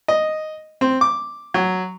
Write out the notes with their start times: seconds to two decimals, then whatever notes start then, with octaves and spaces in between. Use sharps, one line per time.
0.08 D#5
0.81 C4
1.01 D6
1.54 F#3